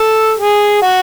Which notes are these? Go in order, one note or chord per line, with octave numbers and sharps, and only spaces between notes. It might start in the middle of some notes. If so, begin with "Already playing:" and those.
Already playing: A4
G#4
F#4